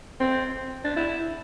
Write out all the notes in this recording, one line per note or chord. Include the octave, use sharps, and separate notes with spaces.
C4
D4
E4